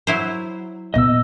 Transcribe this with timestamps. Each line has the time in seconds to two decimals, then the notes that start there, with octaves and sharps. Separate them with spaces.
0.07 F#3 E4 C5
0.94 A#2 B3 D#5 E6